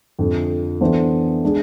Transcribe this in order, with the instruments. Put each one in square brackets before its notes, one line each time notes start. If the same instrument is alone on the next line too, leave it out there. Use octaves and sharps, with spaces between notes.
[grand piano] F2 D3 F3
E3 B3 D4 A4 C5
G#3 D4 G#4